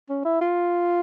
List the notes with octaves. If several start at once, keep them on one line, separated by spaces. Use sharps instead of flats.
C#4
E4
F4